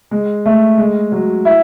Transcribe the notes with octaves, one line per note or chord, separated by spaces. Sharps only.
G#3
A3
G#3
F#3
E4